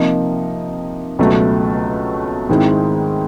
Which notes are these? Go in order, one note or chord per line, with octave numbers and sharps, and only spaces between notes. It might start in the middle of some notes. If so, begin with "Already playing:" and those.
Already playing: C3 F3 A#3 D#4
C#2 B2 F#3 A3
G#2 D#3 G#3 C4 E4